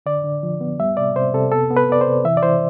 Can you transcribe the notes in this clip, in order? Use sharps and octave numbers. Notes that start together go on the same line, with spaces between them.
D3 D5
D3
F3
B3
G3 E5
C3 D5
C3 C5
C3 A4
B3 A4
B3
B4
B3 D5
C5
C3
E3 E5
D5
E3 C5